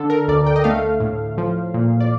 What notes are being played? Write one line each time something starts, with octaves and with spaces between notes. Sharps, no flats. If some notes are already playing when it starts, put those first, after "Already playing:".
Already playing: D3 A4
A#4
D2 D5
G5
D#5
A3 F5
A2
F3
A#2
D5